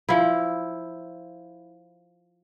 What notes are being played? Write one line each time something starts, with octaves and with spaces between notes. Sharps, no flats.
F3 E4